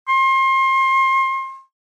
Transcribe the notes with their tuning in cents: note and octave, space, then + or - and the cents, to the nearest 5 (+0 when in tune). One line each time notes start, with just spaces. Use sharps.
C6 +35